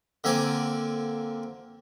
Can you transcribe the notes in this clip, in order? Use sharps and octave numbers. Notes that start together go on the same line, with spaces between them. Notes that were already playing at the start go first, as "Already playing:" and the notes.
D3 A#3 C4 G#5 D6